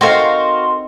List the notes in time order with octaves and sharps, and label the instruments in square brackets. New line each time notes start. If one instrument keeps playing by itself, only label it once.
[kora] C4 D#4 A4 [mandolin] F#4 A#4 F5 [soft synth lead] C6